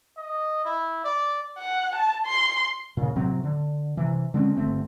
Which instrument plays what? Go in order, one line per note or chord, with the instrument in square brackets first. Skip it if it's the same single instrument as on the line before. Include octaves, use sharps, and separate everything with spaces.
[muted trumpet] D#5
E4
D5
[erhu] F#5
A5
C6
[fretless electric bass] A#2 C#3
A2 C3 F#3 C4
D3
C3 E3
D3 G#3 C4 C#4
G1 D3 A3 C4